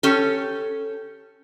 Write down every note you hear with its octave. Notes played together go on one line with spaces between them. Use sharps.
C#4 G4 A4